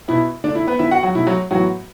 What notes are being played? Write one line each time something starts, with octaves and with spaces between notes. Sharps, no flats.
B2 B3 E4
D3 A3 D4
E4
B3 B4
D3 B3 E4 E5
F#4 F#5
F#3 F#4
B2 A3 E4
F#3 F#4
A2 E3 F#3 B3 F#4